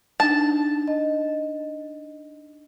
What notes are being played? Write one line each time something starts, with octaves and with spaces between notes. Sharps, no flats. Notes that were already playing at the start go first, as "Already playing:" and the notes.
D4 D#4 A5
D#5